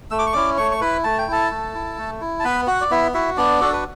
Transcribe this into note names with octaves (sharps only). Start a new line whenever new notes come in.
A3 E6
D6
C#6
C#4 E4 D5 D6
A3 C#5 C#6
C#6
E4 B4 B5
A3 A5
G5
E4 A4 A5
A3
E4
A3
E4
A5
B3 B4 B5
F#4 F#5
D5
B3 E4 E5
E4 F#4 E5
B3 D4 D5
D4 F#4 A4
B4